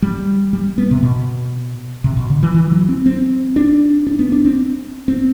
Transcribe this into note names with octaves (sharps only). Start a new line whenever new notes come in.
G3
G3
B3
C3
B2
C3
B2
D3
E3
E3
F#3
C4
C4
D4
D4
B3
D4
C4
C4